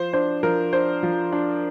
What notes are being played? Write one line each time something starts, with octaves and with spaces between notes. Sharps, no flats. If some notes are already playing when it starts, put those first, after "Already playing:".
Already playing: F3 C5
D4 C5
F3 A#4
D4 C5
F3
D4